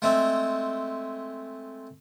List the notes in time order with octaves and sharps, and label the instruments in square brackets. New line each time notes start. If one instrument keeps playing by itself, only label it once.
[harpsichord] G#3 A3 C4